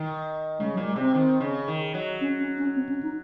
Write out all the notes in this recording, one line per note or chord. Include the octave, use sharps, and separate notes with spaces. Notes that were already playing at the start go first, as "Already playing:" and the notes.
Already playing: D#3
C#3 G#3
F#3
A#2
G#3
C3 C4
D#3
C#3
D#3
F#3
C#4
C#4
C#4
C4
C#4
D#4